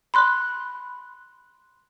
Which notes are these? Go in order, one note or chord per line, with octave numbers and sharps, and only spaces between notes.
B5 C6 F#6